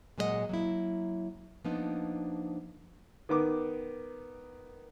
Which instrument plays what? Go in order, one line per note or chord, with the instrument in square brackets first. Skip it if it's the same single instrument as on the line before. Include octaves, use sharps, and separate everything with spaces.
[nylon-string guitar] A#2 F#3 G#3 G#4 D#5 F#5
F#3 A#3 E4
F3 A#3 B3 D4 D#4
[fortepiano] D#3 B3 D6